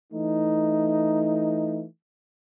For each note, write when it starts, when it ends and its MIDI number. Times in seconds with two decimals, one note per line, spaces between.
0.13 1.85 52
0.13 1.85 57
0.13 1.85 63